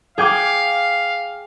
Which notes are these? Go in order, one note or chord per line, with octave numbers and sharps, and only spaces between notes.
G#4 F5 G5 D6